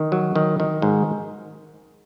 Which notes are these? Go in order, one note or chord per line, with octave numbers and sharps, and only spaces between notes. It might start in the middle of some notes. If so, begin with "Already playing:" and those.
Already playing: D#3
F#3
D#3
D#3
G#2